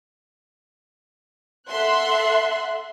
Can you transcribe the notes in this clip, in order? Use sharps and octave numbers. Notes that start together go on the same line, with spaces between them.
A4 E5 F#5 C6 F#6